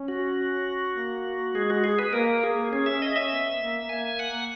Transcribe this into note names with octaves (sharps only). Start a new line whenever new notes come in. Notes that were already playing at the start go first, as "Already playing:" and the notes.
Already playing: C#4
F#4
A#3
G#3 G#4
F#4
G#4
B4
A#3 A#4
G#4
C#4 G#4
E5
D#5
E5
B3
A#3
A#3 G#5
F#5